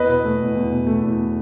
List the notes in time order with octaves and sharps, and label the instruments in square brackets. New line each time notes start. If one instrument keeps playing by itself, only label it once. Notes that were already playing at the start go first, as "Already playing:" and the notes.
Already playing: [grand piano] E2 B4 D#5
B2
A3
E2
E2
B2
A3
E2